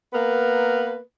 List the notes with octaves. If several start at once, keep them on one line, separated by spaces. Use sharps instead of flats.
A#3 B3 A#4 B4